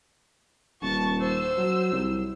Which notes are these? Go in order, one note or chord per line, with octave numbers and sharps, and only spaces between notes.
D#1 A5 C#6
C5 E6
F#3
C2